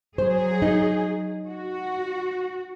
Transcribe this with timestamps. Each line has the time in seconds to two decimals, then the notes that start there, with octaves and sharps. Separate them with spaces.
0.18 F#3 G#4 C5
0.62 D#4
1.48 F#4